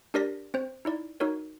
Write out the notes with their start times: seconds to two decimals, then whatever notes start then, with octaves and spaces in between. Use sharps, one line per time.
0.14 D4 G4 A#4 D5 A#6 B6
0.54 C4 C5
0.85 D#4 E4 D5
1.20 D#4 F#4 A#4 C#5